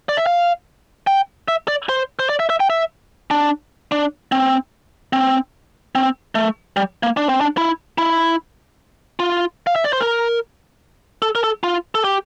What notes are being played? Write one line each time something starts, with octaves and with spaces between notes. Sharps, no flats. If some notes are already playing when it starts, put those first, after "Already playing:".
D5
E5
F5
G5
E5
D5
C5
C5
D5
E5
E5
G5
E5
D4
D4
C4
C4
C4
A3
G3
A#3
D4
C4
D4
E4
E4
F4
F5
E5
D5
C5
A#4
A4
A#4
A4
F4
A4
G4